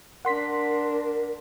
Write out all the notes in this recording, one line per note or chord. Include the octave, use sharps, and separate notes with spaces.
D4 A#4 F#5 C6 B6